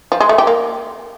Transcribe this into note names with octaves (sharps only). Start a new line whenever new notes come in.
F3
G#3
A3
G4
A#3